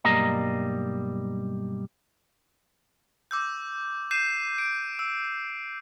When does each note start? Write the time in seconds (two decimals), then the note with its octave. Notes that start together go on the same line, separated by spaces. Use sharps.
0.04 B1 G2 G3 A#3 D#5 A#5
3.31 D6 E6 G6
4.11 G6 C7 D#7 E7
4.58 D7
4.99 E6